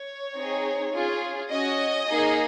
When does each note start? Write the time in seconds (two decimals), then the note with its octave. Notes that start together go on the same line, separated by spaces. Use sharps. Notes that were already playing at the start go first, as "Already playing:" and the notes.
Already playing: C#5
0.36 C4 D#4 G#4
0.94 C#4 F4 G#4
1.51 C#4 F#4 D#5
2.09 A#3 D#4 G#4